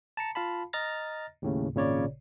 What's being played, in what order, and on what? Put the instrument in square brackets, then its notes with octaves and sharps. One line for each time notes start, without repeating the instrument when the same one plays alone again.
[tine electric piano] A5 A#5 C#7
F4 F5 A5 B5
D#5 A#5 F6 A6 A#6
D#2 A2 C#3
G#1 A#2 C#3 C#5 D5